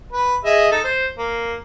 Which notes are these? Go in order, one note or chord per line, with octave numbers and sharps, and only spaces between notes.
B4
G#4 D#5 E5
D#4 A4
C5
A#3